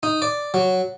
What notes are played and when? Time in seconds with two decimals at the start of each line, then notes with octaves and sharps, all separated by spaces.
0.03 D#4
0.22 D5
0.54 F#3